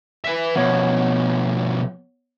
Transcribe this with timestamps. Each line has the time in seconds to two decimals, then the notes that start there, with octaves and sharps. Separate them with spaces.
0.24 B4 E5
0.56 B2 F3 B3 C#5